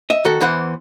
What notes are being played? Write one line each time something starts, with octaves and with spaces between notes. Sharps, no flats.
D#5 E5
D#3 F#4 A4
E2 E3 C5 F#5